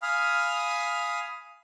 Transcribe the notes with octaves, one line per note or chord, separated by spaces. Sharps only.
F5 G#5 B5 D#6 F6